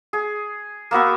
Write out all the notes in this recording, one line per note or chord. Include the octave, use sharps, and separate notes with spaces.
G#4
A#3 B3 F#4 E5